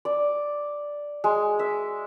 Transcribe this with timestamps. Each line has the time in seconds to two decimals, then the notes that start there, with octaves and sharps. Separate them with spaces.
0.05 D5
1.24 G#3
1.59 E5